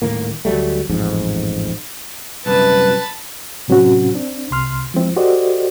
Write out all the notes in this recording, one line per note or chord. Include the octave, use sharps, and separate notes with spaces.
D#1 D#2 A2 A#3
D2 F#3 G3 A3
A1 F2 G#2
C2 F#2 B4 A5 B5
A2 C3 F#3 C4 C#4 F#4
C4 D4
C2 C3 C6 F6
F3 G#3 C4 E4
F#4 G4 A4 C5 D5 D#5